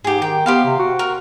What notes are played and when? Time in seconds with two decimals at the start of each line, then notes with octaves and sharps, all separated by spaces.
0.04 G#2 G4 G#4
0.22 D#3 G5
0.46 B3 G4 C5 F5
0.65 C3
0.79 F#4
0.99 A#4